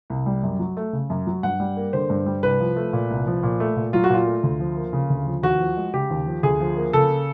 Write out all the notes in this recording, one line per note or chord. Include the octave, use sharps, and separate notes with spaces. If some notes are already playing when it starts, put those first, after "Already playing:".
C2
G3
F#2
F#3
A3
C#3
F#2
F#3
G2 F#5
G3
A#3
D3 C5
G2
G3
C2 B4
F3
A3
A#2
C2
F3
A#2
A3
A#2
F#3 F4
F#4
A#2 F4
A3
D2
F3
A#3
C#3
D2
F3
D#2 F#4
F3
G#3
C#3 G4
D#2
F3
D2 G#4
F3
A#3
C#3 A4